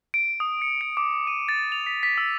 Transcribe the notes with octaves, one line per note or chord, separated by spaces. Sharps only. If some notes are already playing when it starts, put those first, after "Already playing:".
D7
D#6
C#7
D7
D6
D#7
A6
F7
B6
B6
E6